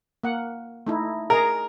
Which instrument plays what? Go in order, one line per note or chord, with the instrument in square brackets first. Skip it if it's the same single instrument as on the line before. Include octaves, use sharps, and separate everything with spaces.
[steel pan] A#3 F#5
A3 D#4 E4
[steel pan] G#4 D#5 A#5 [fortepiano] A#4